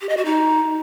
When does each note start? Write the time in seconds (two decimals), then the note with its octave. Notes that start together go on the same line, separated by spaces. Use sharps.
0.01 G4
0.09 D#5
0.17 F#4
0.25 D#4